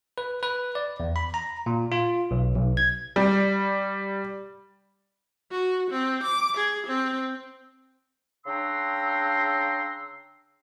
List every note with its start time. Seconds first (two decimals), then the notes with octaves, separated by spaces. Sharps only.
0.18 B4
0.43 B4
0.75 D5
1.00 E2
1.16 B5
1.34 A#5
1.66 A#2
1.92 F4
2.31 B1
2.55 B1
2.77 G#6
3.16 G3
5.52 F#4
5.90 C4
6.23 D6
6.57 G#4
6.87 C4
8.46 C#3 D4 G5 A#5 C6 E6